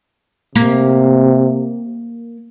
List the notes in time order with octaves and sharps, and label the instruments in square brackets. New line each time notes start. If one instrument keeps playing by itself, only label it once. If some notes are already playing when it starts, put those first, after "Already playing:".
[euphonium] C3 [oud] A#3